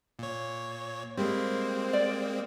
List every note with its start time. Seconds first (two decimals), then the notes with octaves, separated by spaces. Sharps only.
0.19 A#2 C#5
1.17 G3 G#3 A#3 C4 C5
1.93 D5